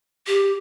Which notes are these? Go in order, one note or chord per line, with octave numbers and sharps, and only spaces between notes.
G4